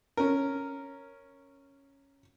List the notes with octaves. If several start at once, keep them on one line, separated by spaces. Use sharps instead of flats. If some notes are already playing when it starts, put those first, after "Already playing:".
C#4 A#4